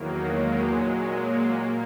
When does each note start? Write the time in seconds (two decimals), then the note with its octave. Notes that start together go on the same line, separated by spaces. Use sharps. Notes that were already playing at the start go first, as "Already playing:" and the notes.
Already playing: E2 D#3 F#3 A#3
0.30 G#3
0.70 A#2 F#3 G#3
1.11 A#3
1.53 A#2